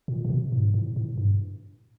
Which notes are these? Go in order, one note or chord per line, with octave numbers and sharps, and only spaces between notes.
A#2
C3
B2
G#2
A2
A2
G2